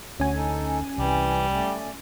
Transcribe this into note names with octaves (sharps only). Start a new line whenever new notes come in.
D2 C#4 F#4 G#5
D#4 A4
C2 E3 G3
A3 D5